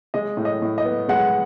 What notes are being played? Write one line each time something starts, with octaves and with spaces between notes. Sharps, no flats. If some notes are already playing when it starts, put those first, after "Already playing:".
G#3 D#5
A2
D#5
A2
D#5
B3
G#3 F#5